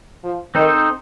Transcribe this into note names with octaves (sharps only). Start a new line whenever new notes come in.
F3
D#3 C4 D#4 A4 C5